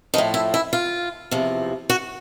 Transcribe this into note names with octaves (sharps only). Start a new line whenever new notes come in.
A2 F3 D#4
E4
E4
F4
E2 C3 F3
F#4